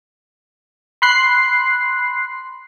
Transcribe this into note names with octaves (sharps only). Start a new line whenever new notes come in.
B5 C6 F#6 C7